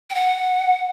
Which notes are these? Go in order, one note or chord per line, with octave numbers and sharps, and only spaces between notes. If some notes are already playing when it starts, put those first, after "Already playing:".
G5
F#5